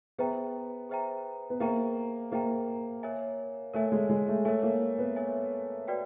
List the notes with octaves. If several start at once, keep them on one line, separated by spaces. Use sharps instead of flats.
B3 G#4 C5 E5 G5 A#5
G#4 C5 E5 G5 A#5
B3
A#3 G#4 C5 E5 G5 A#5
A#3 G#4 C5 E5 G5 A#5
A#4 C#5 E5 G#5
A3 A#4 C#5 E5 G#5
G#3
G#3
A3
A3 A#4 C#5 E5 G#5
A#3
B3
A#4 C#5 E5 G#5
F#4 B4 D5 G5